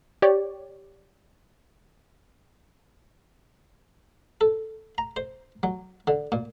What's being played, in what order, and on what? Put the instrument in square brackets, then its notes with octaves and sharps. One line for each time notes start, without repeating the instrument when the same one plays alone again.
[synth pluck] G4 C#5 D5
[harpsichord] A4
A#5
C5
F#3
D3
A#2